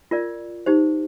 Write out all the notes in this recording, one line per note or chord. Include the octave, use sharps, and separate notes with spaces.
F4 A#4 D5
D#4 G4 C5